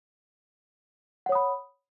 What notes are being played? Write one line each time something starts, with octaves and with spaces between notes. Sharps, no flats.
C#5 F#5 B5 D#6